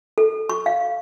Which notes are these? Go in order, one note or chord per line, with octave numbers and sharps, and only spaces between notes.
A4
C#6
F5